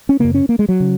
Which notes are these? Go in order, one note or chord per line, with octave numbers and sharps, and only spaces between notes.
C#4
F#2 C#3 A#3
C#4
A#3
G#3
F#3
C#3